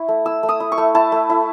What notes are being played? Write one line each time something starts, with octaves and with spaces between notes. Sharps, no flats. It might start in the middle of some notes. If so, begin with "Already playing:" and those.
Already playing: E4 C#6
A3
E4 E6
A3
D#6
E4
C#6
A3
E4 A5
A3
E4